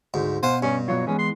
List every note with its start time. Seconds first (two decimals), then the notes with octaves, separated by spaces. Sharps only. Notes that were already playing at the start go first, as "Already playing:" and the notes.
0.14 D2 G#2
0.43 B2 C5 F5 F#5 G#5
0.62 G2 C#4
0.88 B2 F#3 F4 C#5
1.07 E3 G#3 B3 C#4
1.19 C6